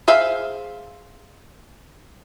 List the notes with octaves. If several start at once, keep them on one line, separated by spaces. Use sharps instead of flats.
G#4 C5 E5 F5